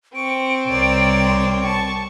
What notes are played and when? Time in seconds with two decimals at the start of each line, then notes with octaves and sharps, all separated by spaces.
0.15 C4 C#6 D7
0.68 C2 A#4 C#5 D5
1.62 A5 C#6